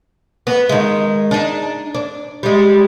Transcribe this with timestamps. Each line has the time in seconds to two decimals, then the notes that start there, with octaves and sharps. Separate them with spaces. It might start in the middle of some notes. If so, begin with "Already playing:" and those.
0.47 B3
0.69 D#3 G#3
1.31 D4 D#4
1.95 D4
2.43 G3 G#3